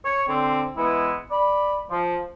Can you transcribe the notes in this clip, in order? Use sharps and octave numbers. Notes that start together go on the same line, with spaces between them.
C#5
D3 C4
E3 G#3 B3 E4
D5 B5
F3